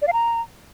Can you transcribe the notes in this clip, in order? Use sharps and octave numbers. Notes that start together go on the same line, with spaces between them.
D5
F5
A#5